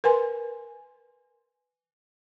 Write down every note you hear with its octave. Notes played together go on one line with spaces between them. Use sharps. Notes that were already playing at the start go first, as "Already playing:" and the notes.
A#4 B4 G#5 C6